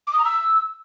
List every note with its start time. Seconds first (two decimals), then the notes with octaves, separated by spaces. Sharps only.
0.07 D6
0.13 D#6
0.19 A#5
0.25 E6